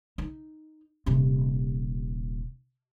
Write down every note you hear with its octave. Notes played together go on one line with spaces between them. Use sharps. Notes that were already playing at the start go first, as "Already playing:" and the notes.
D#4
D#1 C3